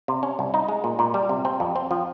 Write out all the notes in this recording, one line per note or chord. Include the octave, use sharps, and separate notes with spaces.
C3
C#4
C2
D#4
G#3
A#2
A#2
G3
C3
C4
F2
C4
F3